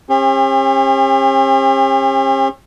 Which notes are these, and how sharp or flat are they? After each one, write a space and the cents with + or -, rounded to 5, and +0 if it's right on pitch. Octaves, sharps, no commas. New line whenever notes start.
C#4 -45 G4 +40